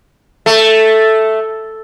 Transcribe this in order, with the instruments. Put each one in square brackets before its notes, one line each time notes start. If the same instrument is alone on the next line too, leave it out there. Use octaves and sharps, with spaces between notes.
[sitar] A3